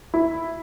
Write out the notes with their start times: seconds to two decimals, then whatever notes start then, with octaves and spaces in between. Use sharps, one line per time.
0.14 E4